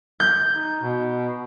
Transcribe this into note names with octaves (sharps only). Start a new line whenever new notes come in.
G6
D#4
B2